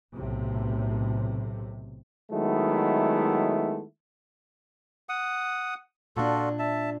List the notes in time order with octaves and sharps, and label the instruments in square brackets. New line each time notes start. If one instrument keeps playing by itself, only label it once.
[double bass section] B1 A2 C3
[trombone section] D#3 F#3 G#3 A3 B3 E4
[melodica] F#5 D#6
[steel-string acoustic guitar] A#2 D4 [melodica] F4 F#4 A4
[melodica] E5 A5